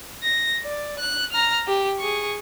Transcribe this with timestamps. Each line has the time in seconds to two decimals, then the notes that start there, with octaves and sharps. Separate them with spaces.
0.23 A#6
0.65 D5
0.99 F#6
1.32 A#5 F6
1.67 G4
1.99 G#4 C#6